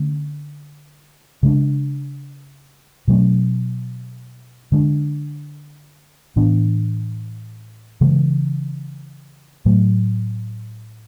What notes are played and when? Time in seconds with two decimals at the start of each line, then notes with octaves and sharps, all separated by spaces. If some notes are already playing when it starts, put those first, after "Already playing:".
Already playing: D3 A3 C#4
1.43 C#3 G#3 D4
3.08 B2 F#3 A3 C#4
4.72 D3 G#3 D4
6.36 A2 E3 B3 D4
8.01 C#3 E3 G#3
9.65 A2 F#3 A3